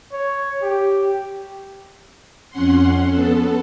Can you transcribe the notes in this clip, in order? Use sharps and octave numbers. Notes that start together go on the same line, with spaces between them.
C#5
G4
F2 C#4 F#5 C6
B3 A4